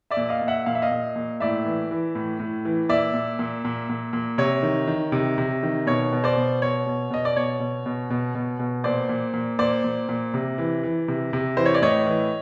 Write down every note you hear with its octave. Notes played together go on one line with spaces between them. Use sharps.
D5 E5
A#2
D#5 F5
A#2
E5 F#5
A#2 F5
E5
D#5 F5
A#2
A#2
A2 D5 E5
E3
E3
A2
A2
E3
A#2 D5 E5
A#2
A#2
A#2
A#2
A#2
C3 C#5
D#3
D#3
C3
C3
D#3
B2 C#5
B2
C5 D5
B2
B2 C#5
B2
B2 D#5
D5
B2 C#5
B2
B2
B2
B2
B2
A#2 C5 D5
A#2
A#2
A#2 C5 D5
A#2
A#2
C3
E3
E3
C3
C3
E3 C5
C#5
D5
A2 C#5 D#5
E3